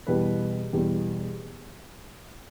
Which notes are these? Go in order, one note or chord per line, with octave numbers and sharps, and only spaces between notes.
E2 B2 G3 B4
E2 B2 G3